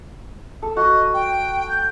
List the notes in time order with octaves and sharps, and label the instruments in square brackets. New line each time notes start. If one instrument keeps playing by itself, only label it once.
[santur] A4
[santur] F#4 [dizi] D#5
[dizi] G5
G6